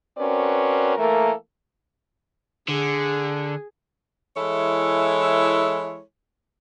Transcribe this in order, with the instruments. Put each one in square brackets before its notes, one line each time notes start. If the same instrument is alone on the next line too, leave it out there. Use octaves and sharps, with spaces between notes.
[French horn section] C4 C#4 F#4 A#4 B4 D5
E3 A3 A#3 A4 A#4
[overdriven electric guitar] D3 [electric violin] G#4
[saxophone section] E3 G#3 E4 A4 C#5